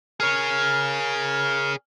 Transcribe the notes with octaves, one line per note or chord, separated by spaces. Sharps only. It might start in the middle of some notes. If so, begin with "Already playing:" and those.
G#4 A#4 C#5 F6